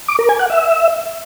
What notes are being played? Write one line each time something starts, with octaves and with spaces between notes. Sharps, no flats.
D6
A#4
G#5
F#5
E5